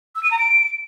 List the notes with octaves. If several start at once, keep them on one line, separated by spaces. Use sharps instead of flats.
E6
D#7
A#5
D7